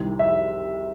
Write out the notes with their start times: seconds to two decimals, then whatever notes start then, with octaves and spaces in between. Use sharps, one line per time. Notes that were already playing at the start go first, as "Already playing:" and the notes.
Already playing: C2 C3 D#3
0.19 E5